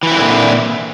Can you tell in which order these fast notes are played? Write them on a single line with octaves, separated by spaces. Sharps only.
E3 E4 C4 D3 A#2